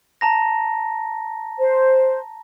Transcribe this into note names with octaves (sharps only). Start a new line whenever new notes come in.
A5 A#5 A#6
C5